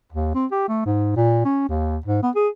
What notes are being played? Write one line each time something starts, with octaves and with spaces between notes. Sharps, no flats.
D#2
C4
G4
A3
G#2
A#2
C#4
D#2
G#2
B3
G#4